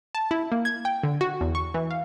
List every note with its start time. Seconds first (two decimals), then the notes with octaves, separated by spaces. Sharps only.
0.15 A5
0.31 E4
0.52 A#3
0.65 G#6
0.85 G5
1.03 D3
1.21 F#4
1.41 E2
1.55 C#6
1.74 E3
1.91 F5